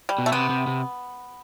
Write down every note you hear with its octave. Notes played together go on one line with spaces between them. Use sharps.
G3
B2
A3
C3 B3
C3
C3